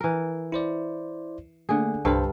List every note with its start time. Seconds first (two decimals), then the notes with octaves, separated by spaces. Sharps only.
0.01 E3 A#4
0.52 E4 C5 D5
1.69 D3 A3 A#3 G#4
2.05 C2 G2 D4 A4 C5 F5